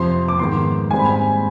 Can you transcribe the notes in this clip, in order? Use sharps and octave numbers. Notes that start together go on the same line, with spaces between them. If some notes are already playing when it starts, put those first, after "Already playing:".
Already playing: F2 C3 F3 C4 C6
D6
G#2 D#3 B3 C6
G#2 G3 C4 G#5
B5
G#5